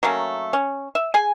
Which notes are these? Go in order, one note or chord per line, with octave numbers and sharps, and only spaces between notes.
F#3 A3 A#3 C#4
C#4
E5
G#4 G#5